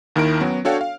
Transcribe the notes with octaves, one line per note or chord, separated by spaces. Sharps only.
D#2 D#3 E4 A#4 D7
F#3 B3 C#4 F#4
D4 F#4 A4 C#5 F5 G5
F5